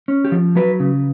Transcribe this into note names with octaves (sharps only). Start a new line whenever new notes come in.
C#4
G4
F3
F#3 B4
C#3